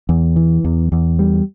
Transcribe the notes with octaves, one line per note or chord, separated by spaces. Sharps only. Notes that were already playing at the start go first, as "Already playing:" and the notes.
E2
E3
E2
E2
G3